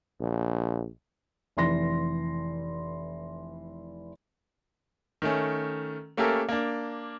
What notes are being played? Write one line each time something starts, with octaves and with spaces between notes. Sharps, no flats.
A#1
F1 E3 C6 A#6
D#3 A3 C#4
A3 A#3 C#4 G4 A4 A#4
A#3 D4